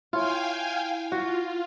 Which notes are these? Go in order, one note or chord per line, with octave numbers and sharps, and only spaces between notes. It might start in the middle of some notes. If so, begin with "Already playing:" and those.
E4 F4 C#5 F5 G5 G#5
F4 F#4